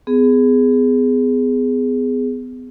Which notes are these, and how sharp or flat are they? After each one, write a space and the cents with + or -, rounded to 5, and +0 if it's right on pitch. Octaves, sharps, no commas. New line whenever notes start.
B3 +35 G#4 +0